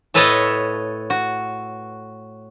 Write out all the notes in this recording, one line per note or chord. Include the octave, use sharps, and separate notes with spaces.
A2 A4 B4 C#5 D#5 A5
F#4